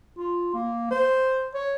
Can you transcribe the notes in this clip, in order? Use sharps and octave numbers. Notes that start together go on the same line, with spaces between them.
F4
A#3
C5
C#5